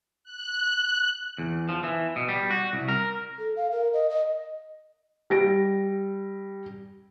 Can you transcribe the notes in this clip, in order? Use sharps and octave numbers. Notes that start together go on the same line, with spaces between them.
F#6
E2
F3
E3
B2
G3
F#4
C2
A#4
A4
F5
A#4
D#5
D#5
G3 A#6 D7